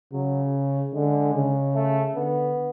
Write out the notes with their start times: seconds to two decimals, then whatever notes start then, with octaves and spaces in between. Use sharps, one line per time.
0.13 C#3 F#3
0.94 D3 G#3
1.34 C#3
1.75 A3
2.16 D3 B3